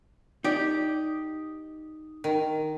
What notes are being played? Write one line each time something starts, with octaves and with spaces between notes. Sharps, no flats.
D#4 G4 D5
D#3